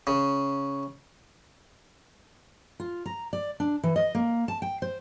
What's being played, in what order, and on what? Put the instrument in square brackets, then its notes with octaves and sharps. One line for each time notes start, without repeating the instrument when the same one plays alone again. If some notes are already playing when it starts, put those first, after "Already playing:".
[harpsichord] C#3
[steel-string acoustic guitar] F4
A#5
D5
D4
E3
D#5
A#3
A5
G5
C5